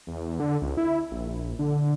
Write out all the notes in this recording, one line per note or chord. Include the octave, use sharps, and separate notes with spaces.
E2
D3
C#2
E4
A#1
D3